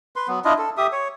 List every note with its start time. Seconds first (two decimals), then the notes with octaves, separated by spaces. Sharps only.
0.16 B4 C6
0.28 F#3 B3
0.45 D4 E4 F4 D#5
0.58 A4
0.77 G4 E5 D#6
0.92 C#5